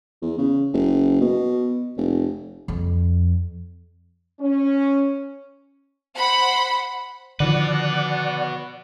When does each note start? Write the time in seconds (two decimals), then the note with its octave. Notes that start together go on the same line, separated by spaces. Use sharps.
0.22 E2
0.38 C#3
0.73 F#1
1.21 B2
1.97 F1
2.68 F2
4.39 C#4
6.17 C5 F#5 B5
7.40 D3 D#3 F3 F#4 B4 D5 F#5